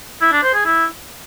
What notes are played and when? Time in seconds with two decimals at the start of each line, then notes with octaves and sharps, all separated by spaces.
0.21 E4
0.32 D4
0.43 C5
0.54 G#4
0.65 E4